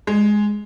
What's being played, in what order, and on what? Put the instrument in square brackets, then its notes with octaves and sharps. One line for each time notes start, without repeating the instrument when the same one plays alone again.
[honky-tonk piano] G#3